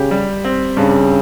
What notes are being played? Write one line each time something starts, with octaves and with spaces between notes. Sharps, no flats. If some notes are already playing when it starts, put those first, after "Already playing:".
Already playing: C#3 G4
G3
C4
G2 C#3